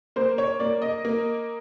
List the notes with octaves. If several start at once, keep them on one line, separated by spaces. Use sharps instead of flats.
A#3 C5
C#5
A#3 D5
D#5
A#3